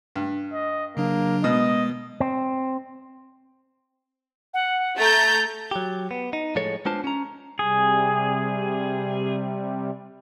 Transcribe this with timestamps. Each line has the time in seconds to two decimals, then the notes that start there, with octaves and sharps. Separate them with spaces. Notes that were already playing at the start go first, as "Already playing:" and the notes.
0.16 G2
0.53 D#5
0.97 C#3 F#3 A#3 D4
1.44 B2 G#3 D#5
2.20 C4
4.54 F#5
4.97 A3 A#5 G6 A6
5.71 F#3 G4
6.11 B3
6.33 D#4
6.55 A2 F3 G#3 A4 C#5
6.85 G#3 B3 D4 F4 C5 A5
7.04 C#4 A#5
7.59 C3 G3 G#4